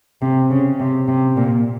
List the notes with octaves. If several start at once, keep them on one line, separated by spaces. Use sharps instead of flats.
C3
C#3
C3
C3
A#2